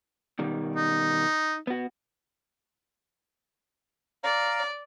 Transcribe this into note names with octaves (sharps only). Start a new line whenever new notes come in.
B2 D#3 G3
D#4
B3 F#4
D5 F5 A#5